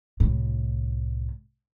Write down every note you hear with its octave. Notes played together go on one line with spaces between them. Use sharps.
C2 A2